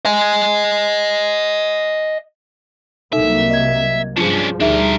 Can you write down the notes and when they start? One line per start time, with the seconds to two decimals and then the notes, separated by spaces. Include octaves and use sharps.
0.05 D#5 G#5
3.13 C2 F#3 A#3 D#4 A4 E5
3.50 D#5 G#6
4.17 G2 F3 C#4 D4 F4 G#4
4.60 D2 G3 D4 D#4 G#4 A#4 E5